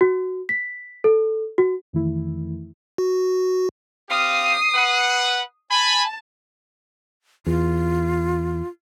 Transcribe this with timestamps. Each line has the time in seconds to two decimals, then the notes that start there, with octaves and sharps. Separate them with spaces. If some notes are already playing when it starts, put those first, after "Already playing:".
0.01 F#4
0.49 B6
1.04 A4
1.58 F#4
1.93 F2 D#3 E3 A3 E4
2.98 F#4
4.10 C4 G4 F5 D#6 C7
4.75 B4 F#5
5.71 G#5 A5 B5
7.46 E2 F4